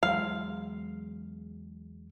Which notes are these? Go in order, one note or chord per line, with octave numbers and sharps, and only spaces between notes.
E2 F#3 G#3 F5